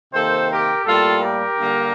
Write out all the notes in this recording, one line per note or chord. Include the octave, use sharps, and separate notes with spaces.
C3 D#3 A#3 A4 C5
G4 A#4
A2 G3 A#3 F4 A4
G4 A#4
G2 D3 G3 A#3